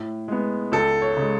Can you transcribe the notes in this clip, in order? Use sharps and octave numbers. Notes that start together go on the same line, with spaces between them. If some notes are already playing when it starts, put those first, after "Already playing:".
Already playing: A2
G#3 B3
C#2 A4
C#5
C#3 G#3